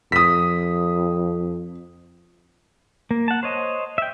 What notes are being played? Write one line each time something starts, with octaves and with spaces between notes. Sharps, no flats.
F2 D#6 B6
A#3
F#5 A5
C5 C#5 D#5
E5 G5